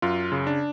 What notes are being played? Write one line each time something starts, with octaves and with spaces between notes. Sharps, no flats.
F#2 F4
C#3
D4